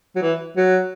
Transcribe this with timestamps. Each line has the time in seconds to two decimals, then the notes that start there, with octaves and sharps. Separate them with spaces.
0.16 F#3
0.22 E3
0.57 F#3